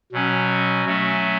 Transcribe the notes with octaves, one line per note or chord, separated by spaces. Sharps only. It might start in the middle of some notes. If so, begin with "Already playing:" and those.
B2 F#3 C#4
F#3 A3 C#4